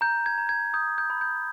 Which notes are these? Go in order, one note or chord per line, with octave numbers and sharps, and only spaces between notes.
A#5 G6
G#6
A#5
G#6
D#6 G6
G6
B5
G6